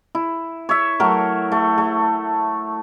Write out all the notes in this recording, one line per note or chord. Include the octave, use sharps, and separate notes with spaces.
E4
C#5 E5
F#3 A3 A#4
A3
A3